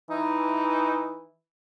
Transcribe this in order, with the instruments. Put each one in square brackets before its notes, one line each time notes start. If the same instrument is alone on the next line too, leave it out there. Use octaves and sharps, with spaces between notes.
[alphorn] E3 [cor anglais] D#4